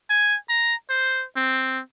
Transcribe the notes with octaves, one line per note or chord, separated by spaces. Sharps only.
G#5
A#5
C5
C4